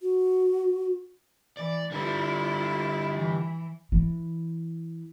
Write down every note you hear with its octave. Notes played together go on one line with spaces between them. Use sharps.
F#4
E3 D5
D3 G3 E4 F4
E3
E3